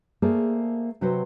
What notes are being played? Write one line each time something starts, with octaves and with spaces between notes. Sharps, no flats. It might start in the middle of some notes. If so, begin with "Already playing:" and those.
A3 A#3 G#4 A4 C5 D5
C3 F#3 F#4 B4 C5